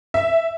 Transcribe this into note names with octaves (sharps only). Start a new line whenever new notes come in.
E5